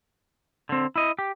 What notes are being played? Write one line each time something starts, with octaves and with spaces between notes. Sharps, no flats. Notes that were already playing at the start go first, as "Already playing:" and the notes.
D3 C4
E4 D#5
G4